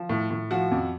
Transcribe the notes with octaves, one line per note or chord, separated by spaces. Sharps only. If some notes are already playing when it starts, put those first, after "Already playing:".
Already playing: F3
A2
A2
F3 F#4
F2